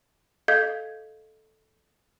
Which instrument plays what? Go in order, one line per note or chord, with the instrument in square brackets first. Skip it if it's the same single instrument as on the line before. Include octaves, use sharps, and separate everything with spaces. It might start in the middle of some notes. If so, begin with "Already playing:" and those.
[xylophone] A4 D#5 F5 G6 G#6 B6